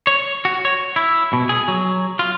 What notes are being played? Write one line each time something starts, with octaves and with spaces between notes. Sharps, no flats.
C#5
F#4
C#5
E4
B2
G#4
F#3
F4